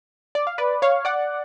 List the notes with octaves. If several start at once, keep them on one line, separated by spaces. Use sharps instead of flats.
D5
F5
B4 D5
C#5 F5
D5 F#5